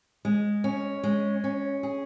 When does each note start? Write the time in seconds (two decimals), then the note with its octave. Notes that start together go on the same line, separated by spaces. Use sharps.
0.25 G#3
0.64 C#4
1.03 G#3
1.44 C#4
1.83 G#4